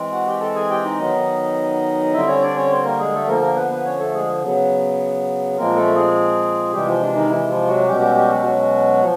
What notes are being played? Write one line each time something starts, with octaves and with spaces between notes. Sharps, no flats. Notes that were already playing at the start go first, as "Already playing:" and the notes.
Already playing: E3 G#3 C4
F#4 F#5
G4 G5
A4 A5
G#4 G#5
G4 G5
D#4 D#5
D#3 F#3 B3
D3 G3 C4 E4 E5
C#4 C#5
D4 D5
C#4 C#5
C4 C5
A#3 A#4
G#3 G#4
A3 A4
D3 F3 A#3 A#4
A#3 A#4
B3 B4
B3 B4
C#4 C#5
A3 A4
G#3 G#4
C#3 F#3 B3
A#2 F3 G#3 A#3 C4 A#4
A3 A4
G#3 G#4
C3 E3 G3 G#3 G4
F3 F4
D4
D#3 D#4
E3 E4
F3 F4
F#3 F#4
B2 G3 G#3 C#4 G4
G3 G4
G3 G4
F#3 F#4
F#3 F#4
F3